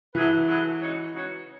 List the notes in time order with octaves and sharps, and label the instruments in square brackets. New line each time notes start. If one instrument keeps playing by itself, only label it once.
[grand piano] E3 [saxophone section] F#3 A3 E4 G#4 B4
[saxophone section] F#3 A3 E4 G#4 B4
C#3 G#3 D#4 F#4 C#5
C#3 G#3 D#4 F#4 C#5